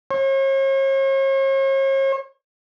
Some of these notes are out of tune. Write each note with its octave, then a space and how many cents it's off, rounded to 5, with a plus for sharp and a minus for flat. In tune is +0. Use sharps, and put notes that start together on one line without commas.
C#5 -45